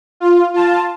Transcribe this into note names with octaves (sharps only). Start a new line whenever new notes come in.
F4
F4 A5